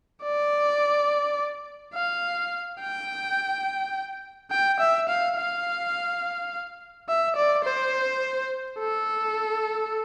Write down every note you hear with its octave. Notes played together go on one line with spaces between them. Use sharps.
D5
F5
G5
G5
E5
F5
F5
E5
D5
C5
A4